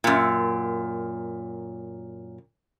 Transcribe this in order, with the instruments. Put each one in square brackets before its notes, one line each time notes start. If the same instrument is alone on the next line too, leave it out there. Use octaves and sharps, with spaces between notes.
[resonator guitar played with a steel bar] F#2 A#2